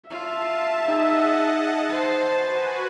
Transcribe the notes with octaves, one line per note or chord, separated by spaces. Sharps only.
F4 E5 A5
D#4 G#4 D#5 F#5 A5
C5 A5
F#4 B4 G#5